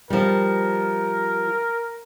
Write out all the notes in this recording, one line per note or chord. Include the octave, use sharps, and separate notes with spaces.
F3 G3 A#4